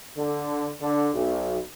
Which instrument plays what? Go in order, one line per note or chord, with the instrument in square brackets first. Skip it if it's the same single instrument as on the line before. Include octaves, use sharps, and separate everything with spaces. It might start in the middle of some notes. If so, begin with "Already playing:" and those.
[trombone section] D3
D3
B1